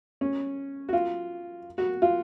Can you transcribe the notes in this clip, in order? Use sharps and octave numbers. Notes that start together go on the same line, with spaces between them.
C#4
F#4
F4
F#4
F4